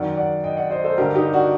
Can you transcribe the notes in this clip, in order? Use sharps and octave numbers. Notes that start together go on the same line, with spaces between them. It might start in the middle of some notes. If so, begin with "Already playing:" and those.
Already playing: F#2 D#3 D5 F#5
D5 F#5
D#5 G5
D5 F#5
C5 D#5
A4 C5
G2 D3 G4 A#4
D#4 G4
D4 F#4